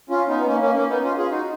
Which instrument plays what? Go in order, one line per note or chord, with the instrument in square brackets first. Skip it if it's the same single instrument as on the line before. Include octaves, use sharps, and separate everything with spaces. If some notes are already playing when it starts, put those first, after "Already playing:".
[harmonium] C#4 F4
B3 D#4
B3
A#3 C#4
A#3 C#4
A#3 C#4
B3 D#4
C#4 F4
F4 G#4
D#4 F#4